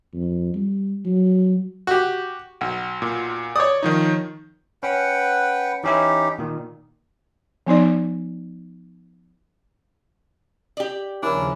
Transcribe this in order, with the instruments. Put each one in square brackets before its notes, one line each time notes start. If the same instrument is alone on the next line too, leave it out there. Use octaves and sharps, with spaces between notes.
[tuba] F2
G3
F#3
[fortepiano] F#4 G4
B1
[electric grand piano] A#2
[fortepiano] C#5 D#6 [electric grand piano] D5
[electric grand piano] D#3 F3 D#4
[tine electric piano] C#4 [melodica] B4 F#5 G5
[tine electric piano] E3 C#4 E4 [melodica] D#4 G4
[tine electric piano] A#2 D#3
[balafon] F3 B3 D#4 D5
[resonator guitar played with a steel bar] G4 D5
[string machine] D#2 C#3 F3 [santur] C#4 E4 A#4 [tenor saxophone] D4